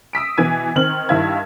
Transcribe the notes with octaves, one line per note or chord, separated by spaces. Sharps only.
D#6 E6 B6 D7
B2 E3 G#6 D#7
D#3 C4 F6 F#7
G2 D#3 E4 F5 G#6